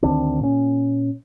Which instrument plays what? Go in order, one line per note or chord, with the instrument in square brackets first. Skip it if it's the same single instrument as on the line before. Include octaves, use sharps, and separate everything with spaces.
[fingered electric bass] D2 D#3 C4 D4
A#2 C#4